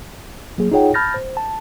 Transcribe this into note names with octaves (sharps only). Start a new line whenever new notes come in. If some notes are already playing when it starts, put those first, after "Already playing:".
F#3 A#3 G#4
D#4 F4 G#4 C#5 F#5 G5
A5 B5 F6 G6 A6 A#6
C5
A5